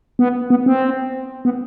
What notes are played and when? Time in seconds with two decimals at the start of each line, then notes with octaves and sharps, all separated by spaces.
0.19 B3
0.50 B3
0.66 C4
1.45 B3